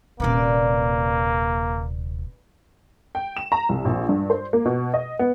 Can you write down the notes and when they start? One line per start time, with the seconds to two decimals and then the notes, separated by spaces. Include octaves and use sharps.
0.20 D#1 C3 A#3 B4 C#5 D5
3.15 G5
3.37 E7
3.52 A#5
3.69 C2
3.85 A#1
4.09 G2
4.30 C5
4.53 A#3
4.65 B2
4.94 D#5
5.19 B3